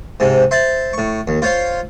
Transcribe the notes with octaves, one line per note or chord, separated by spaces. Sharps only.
G#2 C3
C5 E5 A5
A2 C#6
D#2
F4 C5 C#5 F5